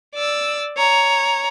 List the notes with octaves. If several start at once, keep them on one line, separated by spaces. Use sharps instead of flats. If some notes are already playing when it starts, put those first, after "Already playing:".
D5 E6
C#5 A#5